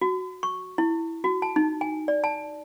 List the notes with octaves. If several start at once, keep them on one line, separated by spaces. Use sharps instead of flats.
F#4
C#6
E4
F#4
A5
D#4
G#5
D5
A5